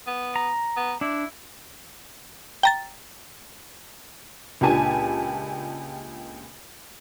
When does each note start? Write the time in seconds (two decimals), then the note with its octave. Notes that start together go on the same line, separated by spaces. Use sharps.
0.07 B3
0.36 A#5
0.77 B3
1.01 D4 E4
2.63 G5 A#5 A6
4.61 C#2 A#2 D4 G4 G#5 A5